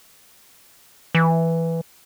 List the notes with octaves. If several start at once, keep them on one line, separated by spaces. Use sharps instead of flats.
E3